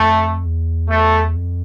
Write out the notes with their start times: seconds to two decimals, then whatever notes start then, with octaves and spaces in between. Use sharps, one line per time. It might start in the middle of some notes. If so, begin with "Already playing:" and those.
Already playing: F2 A3
0.45 E2
0.90 A3
1.36 F2